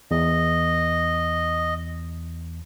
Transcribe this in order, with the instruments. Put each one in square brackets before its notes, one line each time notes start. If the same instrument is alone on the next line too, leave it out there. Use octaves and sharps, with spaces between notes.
[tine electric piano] E2 [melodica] D#5